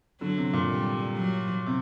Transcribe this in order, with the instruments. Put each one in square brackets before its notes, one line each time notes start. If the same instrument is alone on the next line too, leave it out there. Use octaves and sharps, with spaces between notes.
[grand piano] D3 [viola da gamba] F#3
[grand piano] C3
A#2
[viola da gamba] G3
F#3
[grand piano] C3